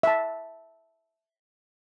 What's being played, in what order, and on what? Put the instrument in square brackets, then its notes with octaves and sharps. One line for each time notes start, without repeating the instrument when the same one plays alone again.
[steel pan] E5 A5